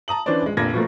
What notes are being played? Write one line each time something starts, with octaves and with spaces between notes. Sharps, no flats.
A5 A#5 D#6 F#7
E3 C#4 D4 B4 C5 D5
D#1 G#3
F1 A#2 D3 G#6 A#6
B2 F3 A3 A#3